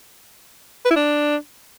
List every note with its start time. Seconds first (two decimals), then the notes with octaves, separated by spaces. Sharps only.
0.85 B4
0.91 E4
0.96 D4